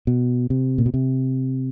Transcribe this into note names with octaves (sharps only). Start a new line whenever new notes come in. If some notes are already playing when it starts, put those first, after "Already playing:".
B2
C3
A#2
B2
C3